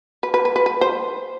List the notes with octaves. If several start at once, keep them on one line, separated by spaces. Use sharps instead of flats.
B4
B4
B4
B4
B4
C5